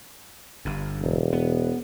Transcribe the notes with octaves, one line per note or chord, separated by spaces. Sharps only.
G1 G2
E1
B3